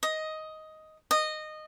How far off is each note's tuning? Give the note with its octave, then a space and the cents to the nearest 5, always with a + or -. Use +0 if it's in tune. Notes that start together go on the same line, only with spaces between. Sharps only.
D#5 +10
D#5 -15